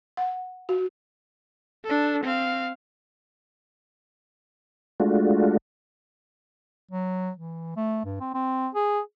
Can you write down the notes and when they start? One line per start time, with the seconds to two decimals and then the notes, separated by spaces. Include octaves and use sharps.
0.17 F#5
0.69 F#4
1.85 D4 A4
2.23 C4 F5
5.00 G#3 A3 D4 F4 F#4
6.91 F#3
7.37 E3
7.76 A3
8.05 G2
8.20 C4
8.34 C4
8.75 G#4